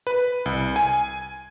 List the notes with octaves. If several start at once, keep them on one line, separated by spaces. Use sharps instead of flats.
B4
C2
G#5